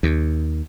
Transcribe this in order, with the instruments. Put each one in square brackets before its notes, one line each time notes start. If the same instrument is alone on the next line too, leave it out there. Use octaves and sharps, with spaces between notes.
[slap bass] D#2